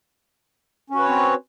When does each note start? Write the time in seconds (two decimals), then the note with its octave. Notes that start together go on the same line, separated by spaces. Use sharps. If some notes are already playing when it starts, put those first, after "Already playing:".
0.90 C#4
0.95 F#4
0.99 B4
1.04 C#5
1.08 C4